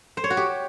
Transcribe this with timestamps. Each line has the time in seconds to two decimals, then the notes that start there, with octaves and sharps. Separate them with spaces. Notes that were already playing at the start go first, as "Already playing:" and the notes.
0.17 C5
0.24 C#5
0.30 F#4
0.37 G4